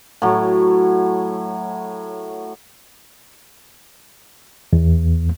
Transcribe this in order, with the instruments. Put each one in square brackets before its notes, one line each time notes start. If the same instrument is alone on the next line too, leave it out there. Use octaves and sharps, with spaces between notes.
[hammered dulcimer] A2 F#3
[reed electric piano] E2